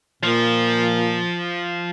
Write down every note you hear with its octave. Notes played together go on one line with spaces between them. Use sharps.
A#2 F3